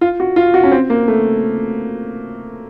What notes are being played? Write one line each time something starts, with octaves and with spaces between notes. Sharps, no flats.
F4
F#4
F4
F#4
C#4
C4
A#3
A3